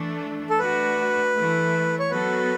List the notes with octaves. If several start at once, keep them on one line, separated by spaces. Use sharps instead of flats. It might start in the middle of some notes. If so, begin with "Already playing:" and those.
Already playing: E3 A3 D4
A4
A3 D4 F#4 B4
E3 A3 E4
C#5
F#3 B3 F#4 A4 B4